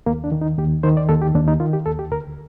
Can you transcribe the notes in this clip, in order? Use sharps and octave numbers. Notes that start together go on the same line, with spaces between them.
D#2 A#3
D4
D#3
D#4
D#2 G4
D#3 C5
D5
D#2 A4
G4
D#2 D4
D#4
D#3 F4
G4
D#2 A4
G4
D2 A#4